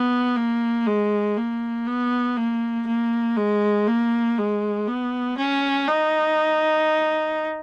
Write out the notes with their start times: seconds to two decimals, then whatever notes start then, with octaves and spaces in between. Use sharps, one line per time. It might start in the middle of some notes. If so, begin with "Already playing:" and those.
Already playing: B3
0.37 A#3
0.86 G#3
1.37 A#3
1.87 B3
2.37 A#3
2.87 A#3
3.37 G#3
3.88 A#3
4.38 G#3
4.87 B3
5.38 C#4
5.88 D#4